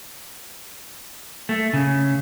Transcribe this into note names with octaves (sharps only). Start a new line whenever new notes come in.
A3
C#3